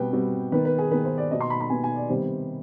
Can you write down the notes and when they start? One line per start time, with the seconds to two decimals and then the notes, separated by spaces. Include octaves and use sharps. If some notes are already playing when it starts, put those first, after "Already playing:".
Already playing: B2 G3 C4 B4 G5
0.13 B2 G3 C4
0.52 D#3 B3 B4
0.65 B4
0.78 G#4
0.91 D#3 B3 B4
1.05 C5
1.18 D5
1.31 B2 B3 D#5
1.41 C6
1.50 B5
1.60 B5
1.70 B2 B3 G#5
1.84 G#5
1.96 D5
2.09 C3 D#3 G3 B3 C5